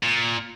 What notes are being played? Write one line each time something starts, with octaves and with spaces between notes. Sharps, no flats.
A#2